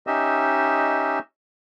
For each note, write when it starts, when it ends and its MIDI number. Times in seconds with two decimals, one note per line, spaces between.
0.07 1.19 61
0.07 1.19 63
0.07 1.19 67
0.07 1.19 75
0.07 1.19 76